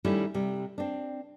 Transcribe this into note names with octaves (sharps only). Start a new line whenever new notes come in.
D#3 G3 A3 C#4 E4
C3 G3
C4 D4